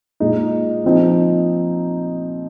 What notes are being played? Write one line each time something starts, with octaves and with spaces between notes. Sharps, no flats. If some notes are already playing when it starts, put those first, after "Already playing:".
A#2 G#3 D#4
F3 C4 D#4